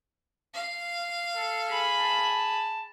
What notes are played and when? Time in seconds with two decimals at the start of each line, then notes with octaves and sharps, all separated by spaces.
0.54 F5
1.36 A4
1.68 G#4 B5
1.99 A5